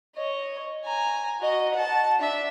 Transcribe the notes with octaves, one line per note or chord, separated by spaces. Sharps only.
C#5 D#5
G#5 A#5
F#4 D#5
F#5 A5
D4 E5